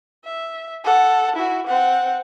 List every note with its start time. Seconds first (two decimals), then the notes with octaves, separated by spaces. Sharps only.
0.24 E5
0.84 A4 F#5
1.36 E4 F#4
1.66 C4 F#5